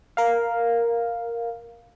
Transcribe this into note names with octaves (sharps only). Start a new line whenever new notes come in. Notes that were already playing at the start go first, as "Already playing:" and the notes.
A#4 F5